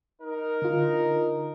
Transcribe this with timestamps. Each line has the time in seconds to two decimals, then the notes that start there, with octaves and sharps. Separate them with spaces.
0.22 D#4 A#4
0.62 D3 F4